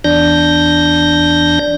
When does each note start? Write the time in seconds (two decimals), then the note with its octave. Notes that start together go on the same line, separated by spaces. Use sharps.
0.04 E2 D4 G6 A#6